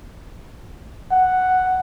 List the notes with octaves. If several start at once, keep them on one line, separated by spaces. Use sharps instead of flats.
F#5